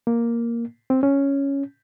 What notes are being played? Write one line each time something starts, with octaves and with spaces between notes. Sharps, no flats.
A#3
C4
C#4